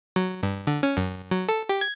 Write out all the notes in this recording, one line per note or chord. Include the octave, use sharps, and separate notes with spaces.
F#3
G2
D3
C#4
F#2
F#3
A4
G4
G#6